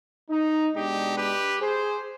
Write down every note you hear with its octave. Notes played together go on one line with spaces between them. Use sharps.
D#4
B2 G#3 D4 D#4 G4
G4 B4
G#4 C5